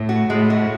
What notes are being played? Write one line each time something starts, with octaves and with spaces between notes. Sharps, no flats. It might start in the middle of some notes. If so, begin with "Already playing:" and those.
Already playing: A2
F#4
A2 G#3
F#4